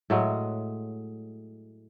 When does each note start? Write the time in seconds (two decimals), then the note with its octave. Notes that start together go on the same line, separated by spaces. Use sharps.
0.10 A2 F#3 G#3